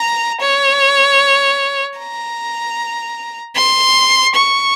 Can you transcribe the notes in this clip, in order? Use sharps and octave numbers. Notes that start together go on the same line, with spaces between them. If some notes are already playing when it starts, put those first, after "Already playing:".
Already playing: A#5
C#5
A#5
C6
C#6